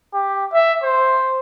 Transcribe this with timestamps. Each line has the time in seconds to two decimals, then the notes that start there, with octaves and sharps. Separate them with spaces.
0.13 G4
0.53 E5
0.83 C5